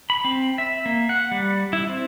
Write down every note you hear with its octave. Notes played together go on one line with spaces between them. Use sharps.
B5
C4
E5
A#3
F#5
G3
E4
C4